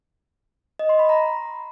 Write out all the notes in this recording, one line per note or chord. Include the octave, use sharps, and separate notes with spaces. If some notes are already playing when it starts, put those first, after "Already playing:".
D#5
C6
B5
A#5